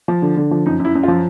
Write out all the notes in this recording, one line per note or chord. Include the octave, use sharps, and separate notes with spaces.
F3
D3
D3
F3
F#2 D#4
F#2
E4
F#2
F4
F3